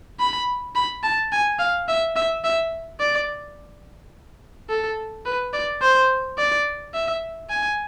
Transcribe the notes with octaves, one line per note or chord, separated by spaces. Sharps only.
B5
B5
A5
G#5
F5
E5
E5
E5
D5
A4
B4
D5
C5
D5
E5
G#5